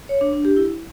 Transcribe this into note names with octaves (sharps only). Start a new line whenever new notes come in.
C#5
D4
D4
G4
E4